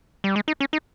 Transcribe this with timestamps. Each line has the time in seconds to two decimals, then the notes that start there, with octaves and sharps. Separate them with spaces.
0.24 G3
0.36 G#3
0.48 D#4
0.60 C#4
0.73 D#4